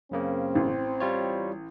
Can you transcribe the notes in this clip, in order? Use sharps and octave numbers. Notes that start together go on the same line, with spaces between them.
F#2 C#3 A#3 C4
A1
G3 F4 C#5